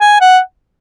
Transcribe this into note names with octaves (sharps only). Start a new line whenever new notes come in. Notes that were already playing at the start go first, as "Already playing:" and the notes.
G#5
F#5